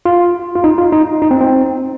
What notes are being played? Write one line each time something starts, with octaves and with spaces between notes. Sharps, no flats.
F4
F4
D#4
F4
D#4
D#4
C4
C4